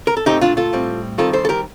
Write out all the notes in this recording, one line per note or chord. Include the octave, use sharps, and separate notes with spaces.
A#4
A4
A#2 A3 C4 D#4 G4
D4 F4
F4 A4
A2 G3 C4
D#3 G3 C4 F4 A4
A4 C5
A4
G4 A#4